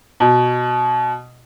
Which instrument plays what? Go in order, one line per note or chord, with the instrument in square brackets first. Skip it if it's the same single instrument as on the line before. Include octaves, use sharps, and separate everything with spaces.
[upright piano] B2